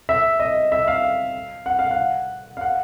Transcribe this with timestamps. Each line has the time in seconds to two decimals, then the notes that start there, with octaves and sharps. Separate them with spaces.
0.09 E5
0.40 D#5
0.72 E5
0.88 F5
1.66 F#5
1.79 F5
1.91 F#5
2.57 F5
2.61 F#5